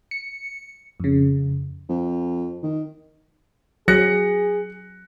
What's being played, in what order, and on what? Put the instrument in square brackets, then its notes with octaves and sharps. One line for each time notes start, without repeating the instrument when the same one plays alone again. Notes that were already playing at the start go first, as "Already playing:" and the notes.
[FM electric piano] C#7
F2 C#3
[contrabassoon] F2
D#3
[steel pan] F#3 [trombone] G#4 [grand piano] F#6 A#6 C#7